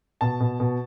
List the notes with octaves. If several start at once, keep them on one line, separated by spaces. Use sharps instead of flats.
B2 A5
B2
B2